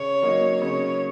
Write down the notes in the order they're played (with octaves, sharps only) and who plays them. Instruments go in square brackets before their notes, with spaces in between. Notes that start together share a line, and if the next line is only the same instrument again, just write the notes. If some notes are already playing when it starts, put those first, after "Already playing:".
Already playing: [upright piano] C#3 [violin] C#5
[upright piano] F#3 A#3 D#4
[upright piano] C#3 [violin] C#5